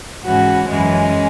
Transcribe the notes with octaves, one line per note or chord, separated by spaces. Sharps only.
G#2 E3 C#4 F#4
F#2 E3 G#3 C#4